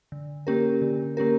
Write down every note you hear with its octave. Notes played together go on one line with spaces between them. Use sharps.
D3
A#3 C#4 G4 A#4
D3
A#3 C#4 G4 A#4